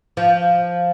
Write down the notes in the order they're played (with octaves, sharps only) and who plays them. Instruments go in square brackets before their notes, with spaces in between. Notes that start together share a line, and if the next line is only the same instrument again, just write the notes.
[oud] F3